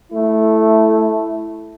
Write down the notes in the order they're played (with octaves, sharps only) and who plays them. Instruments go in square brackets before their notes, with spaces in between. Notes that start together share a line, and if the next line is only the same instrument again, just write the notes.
[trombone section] A3 E4